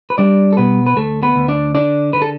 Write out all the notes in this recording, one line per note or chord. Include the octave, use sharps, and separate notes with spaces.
B4
G3 D4 D5
A4
B2 B3 B4
B4
D2 A3 A4
B3 B4
D2
D4 D5
D3 D4 D5
D3 B4
A4